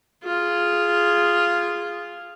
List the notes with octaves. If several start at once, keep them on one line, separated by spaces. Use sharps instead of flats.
F4 G#4